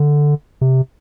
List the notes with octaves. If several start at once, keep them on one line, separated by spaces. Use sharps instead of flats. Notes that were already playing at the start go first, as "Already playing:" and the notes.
Already playing: D3
C3